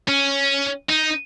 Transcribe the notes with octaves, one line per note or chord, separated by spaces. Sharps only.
C#4
D#4